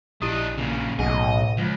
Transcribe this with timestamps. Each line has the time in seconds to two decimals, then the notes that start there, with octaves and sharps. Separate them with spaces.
0.22 A#1 D4 E4 G4 D#5 D#6
0.58 A#2 C#3
0.99 B1 A2 G#4 D#5 F#5 G#5
1.58 C#2 F3